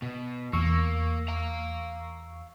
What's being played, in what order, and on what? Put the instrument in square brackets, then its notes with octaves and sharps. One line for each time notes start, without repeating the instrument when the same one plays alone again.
[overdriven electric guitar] B2
[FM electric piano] E2 C#6 E6 [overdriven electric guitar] A#3
[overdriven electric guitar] F5 A#5